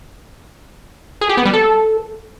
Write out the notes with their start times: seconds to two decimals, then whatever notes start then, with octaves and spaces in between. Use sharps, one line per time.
1.21 G#4
1.29 G4
1.37 B3
1.45 G3
1.53 A4